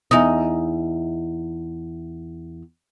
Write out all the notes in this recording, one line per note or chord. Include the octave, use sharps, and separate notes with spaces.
E2 D#4